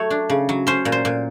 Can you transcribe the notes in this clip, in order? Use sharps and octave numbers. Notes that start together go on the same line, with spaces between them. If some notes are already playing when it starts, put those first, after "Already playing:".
Already playing: F#3 A3 C#5
D4
C#3
F#3
C#4 C5
A#2
C5
A#2